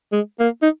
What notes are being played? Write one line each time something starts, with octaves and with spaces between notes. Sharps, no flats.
G#3
A#3
D#4